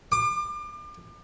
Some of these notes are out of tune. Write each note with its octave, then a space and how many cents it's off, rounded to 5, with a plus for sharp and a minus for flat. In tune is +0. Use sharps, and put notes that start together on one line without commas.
D6 +35